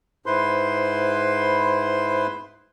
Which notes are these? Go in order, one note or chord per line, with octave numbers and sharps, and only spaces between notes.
G#2 E4 B4 C5 C6